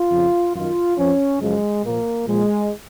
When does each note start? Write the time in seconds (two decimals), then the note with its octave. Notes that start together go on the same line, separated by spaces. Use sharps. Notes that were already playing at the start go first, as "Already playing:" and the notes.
Already playing: F4
0.10 F2 C#3 F3
0.54 F#2 D#3 F4
0.97 F2 F3 C#4
1.40 F#2 C#3 F3 G#3
1.83 A#2 F3 A#3
2.26 A#2 F3 G#3